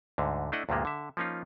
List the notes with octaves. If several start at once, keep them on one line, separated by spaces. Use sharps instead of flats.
D2 G#2 D3
A3 D4 E4 D#5 F#5
D2 G2 A#2 G3 G#3 A#3
D3 E5
F3 A#3 C#4 D#4 F4